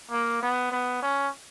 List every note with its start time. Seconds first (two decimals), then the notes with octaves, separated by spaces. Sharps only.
0.11 A#3
0.43 B3
0.72 B3
1.02 C#4